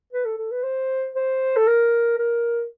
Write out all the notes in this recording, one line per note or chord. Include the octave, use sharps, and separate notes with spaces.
B4
A4
A4
B4
C5
C5
A4
A#4
A#4